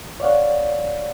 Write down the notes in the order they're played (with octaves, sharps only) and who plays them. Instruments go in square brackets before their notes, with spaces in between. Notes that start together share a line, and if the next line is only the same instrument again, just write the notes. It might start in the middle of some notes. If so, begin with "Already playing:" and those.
[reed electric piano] C#5 D5 F5 F#5